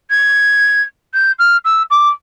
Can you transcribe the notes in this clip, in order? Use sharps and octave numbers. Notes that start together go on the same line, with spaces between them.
G#6
G6
F6
E6
D6